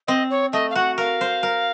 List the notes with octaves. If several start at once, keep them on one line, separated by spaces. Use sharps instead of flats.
C4 D#5
C#5
A3 D#5
F5
F#4 F#5
A#4 F5
C5
A#4